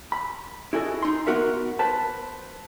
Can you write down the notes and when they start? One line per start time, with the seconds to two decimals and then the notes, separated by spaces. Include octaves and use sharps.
0.12 B5
0.73 E4 F#4 G#4 A4 D#5
1.02 D#4 C6
1.27 A#3 B3 F#4 A#4 E5
1.79 B4 C5 A5